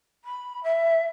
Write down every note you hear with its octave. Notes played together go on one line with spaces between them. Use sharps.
B5
E5